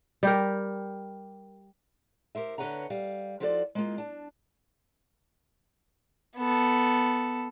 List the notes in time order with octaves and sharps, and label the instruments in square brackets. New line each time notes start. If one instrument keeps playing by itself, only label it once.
[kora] G3 G4 A#4
[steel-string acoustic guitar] G4 A#4 C5 E5
D3 A#4 B4 C#5 F#5 A#5
G3 F5
F3 F4 F#4 A4 C5 D5
G#3 A#3 F4
D4 A5
[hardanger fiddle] B3 A4